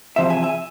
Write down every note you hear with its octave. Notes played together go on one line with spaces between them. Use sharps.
E2 C3 F3 C5 E5
E5 G#5
E5 G#5